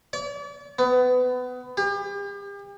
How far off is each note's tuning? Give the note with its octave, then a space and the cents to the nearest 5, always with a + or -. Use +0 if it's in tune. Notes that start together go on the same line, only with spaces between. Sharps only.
D5 -40
B3 +25
G4 +40